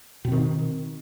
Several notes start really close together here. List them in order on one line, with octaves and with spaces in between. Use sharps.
B2 C4 D#3